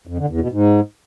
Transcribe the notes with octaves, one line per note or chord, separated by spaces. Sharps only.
F2
D3
E2
B2
G#2